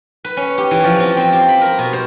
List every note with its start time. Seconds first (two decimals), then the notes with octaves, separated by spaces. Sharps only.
0.25 B4
0.37 C#4
0.58 G4
0.71 E3
0.84 F3
1.00 C4
1.17 C4
1.32 G4
1.49 B5
1.61 A#4
1.79 B2
1.93 C5